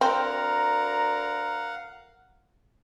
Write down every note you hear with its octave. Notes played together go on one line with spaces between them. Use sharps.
D2 C4 A#4 F5 F#5 A#5